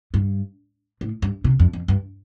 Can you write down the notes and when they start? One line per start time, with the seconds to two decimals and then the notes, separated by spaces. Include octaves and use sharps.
0.14 G2
1.01 A2
1.22 G2
1.44 C3
1.59 F2
1.73 F2
1.88 G2